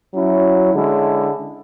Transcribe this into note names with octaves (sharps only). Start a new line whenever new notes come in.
F#3 C#4 E4
D3 G#3 C#4 E4